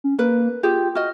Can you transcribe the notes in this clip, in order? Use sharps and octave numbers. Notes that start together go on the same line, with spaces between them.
C#4
A#3 A#4 B4
F4 G4 G#4 G5
F#4 D#5 F6